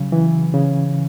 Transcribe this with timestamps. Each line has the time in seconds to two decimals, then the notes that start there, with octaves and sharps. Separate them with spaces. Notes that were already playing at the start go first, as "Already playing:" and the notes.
Already playing: C#3 F#3
0.12 E3
0.53 C#3